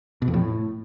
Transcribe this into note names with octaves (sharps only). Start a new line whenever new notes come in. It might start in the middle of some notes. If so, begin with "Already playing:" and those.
B2
F2
A2